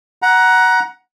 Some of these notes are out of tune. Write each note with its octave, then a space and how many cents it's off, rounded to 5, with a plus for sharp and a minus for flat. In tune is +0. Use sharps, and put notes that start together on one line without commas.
F#5 +5 A#5 +25